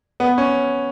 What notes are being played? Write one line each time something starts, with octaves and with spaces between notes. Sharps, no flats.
B3
C#4